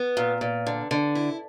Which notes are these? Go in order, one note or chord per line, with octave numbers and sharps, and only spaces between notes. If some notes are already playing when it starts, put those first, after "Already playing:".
Already playing: B3
A#2
A#2
D3
D3
E4